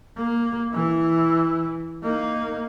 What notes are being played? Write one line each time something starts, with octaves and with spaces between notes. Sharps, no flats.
A#3
E3 E4
A#3 D#4